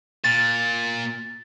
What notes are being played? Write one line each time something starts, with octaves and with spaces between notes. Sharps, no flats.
A#2 A6